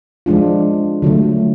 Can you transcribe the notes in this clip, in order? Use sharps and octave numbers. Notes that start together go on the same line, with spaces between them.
F3 G#3 D4 F4
D3 F#3 A3